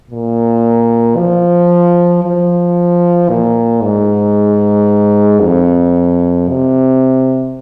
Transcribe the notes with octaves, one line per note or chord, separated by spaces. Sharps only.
A#2
F3
F3
A#2
G#2
F2
C3